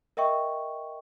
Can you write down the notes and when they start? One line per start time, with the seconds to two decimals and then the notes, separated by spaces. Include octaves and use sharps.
0.17 A#4 D#5 E5 G5 C#6